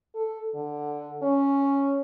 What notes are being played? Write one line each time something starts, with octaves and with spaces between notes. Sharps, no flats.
A4
D3
C#4